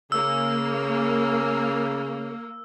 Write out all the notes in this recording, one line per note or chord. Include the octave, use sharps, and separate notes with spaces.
C#3 A#3 E6